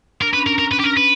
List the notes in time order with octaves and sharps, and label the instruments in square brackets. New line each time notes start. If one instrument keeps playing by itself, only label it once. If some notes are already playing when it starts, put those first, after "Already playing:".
[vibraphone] D4 [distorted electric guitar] A#4
[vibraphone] C#4 [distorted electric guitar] B4
[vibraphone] D4
[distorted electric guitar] A#4
[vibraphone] D4
[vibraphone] C#4 [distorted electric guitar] A#4
[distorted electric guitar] B4
G4
A#4
B4